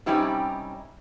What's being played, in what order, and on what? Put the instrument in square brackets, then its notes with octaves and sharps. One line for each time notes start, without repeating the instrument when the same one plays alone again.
[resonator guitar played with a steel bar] C3 G3 C#4 D#4 E4 G4